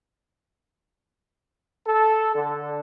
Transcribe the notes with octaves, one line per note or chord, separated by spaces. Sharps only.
A4
D3